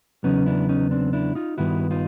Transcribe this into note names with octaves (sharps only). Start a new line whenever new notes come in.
E2 C#3 F#3 B3 C#4 D#4
D4 E4
C#4 D#4
C4 D4
D4 E4
D#4 F4
G2 D#3 G3 B3 E4 F#4
D#4 F4